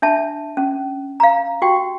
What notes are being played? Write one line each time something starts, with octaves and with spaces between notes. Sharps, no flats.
D4 E5 A5
C#4
F5 A#5
F#4 G4 G5